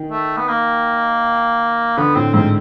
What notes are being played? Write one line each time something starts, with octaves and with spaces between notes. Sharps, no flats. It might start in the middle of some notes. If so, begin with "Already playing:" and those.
Already playing: D#3
A3
B3
A#3
D3 B3
A2 C4
G#2 C4